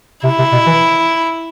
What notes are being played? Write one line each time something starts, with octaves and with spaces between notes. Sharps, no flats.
C3 E4
C3
B2
E3